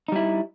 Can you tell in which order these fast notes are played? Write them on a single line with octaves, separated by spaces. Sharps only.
D#4 G3 E4